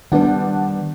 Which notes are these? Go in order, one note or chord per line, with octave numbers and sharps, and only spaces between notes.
D#3 G3 B3 D4 F#5